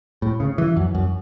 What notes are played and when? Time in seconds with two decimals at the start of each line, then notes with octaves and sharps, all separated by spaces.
0.22 A2
0.40 C#3
0.58 E3
0.77 F#2
0.95 F#2